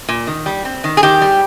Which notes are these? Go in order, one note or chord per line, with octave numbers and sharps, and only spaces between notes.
A#2
D#3
G3
C4
D#3
G#4
D#3 G4
G3